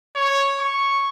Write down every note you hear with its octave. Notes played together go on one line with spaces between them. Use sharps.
C#5
C#6